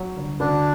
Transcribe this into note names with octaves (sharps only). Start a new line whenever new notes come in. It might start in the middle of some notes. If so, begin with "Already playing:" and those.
Already playing: F#3
G1
D2 D4